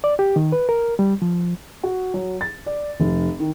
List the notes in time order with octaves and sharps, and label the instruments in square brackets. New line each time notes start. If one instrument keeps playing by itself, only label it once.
[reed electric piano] D5
G4
D#3
B4
A#4
G3
F3
[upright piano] F#4
F#3
A6
D5
F1
D#3